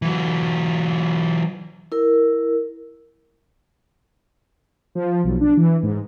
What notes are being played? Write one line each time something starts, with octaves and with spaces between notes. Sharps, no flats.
E3 F#3
E4 A#4
F3
B1
D4
E3
G#2